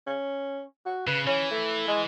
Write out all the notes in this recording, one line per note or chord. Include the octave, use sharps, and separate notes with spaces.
C#4
F#4
C#3 B4
E3 C#4
A3
G#3